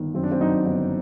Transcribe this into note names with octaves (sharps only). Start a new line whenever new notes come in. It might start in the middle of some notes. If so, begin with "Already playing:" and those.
Already playing: G1 D#3
F#2 C4
D4
C4
F#3 D#4
G1 D#4